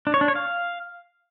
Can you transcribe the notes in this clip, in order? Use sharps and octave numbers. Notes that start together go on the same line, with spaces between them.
D4
C#5
D4
C#5
F5